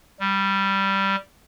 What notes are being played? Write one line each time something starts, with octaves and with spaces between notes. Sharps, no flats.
G3